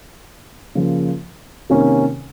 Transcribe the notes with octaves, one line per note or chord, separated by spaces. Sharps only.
C#3 F3 A#3
C3 D#3 A#3 C#4